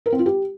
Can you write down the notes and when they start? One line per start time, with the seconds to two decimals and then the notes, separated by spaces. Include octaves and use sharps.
0.06 A#4
0.12 C4
0.19 F4
0.26 G4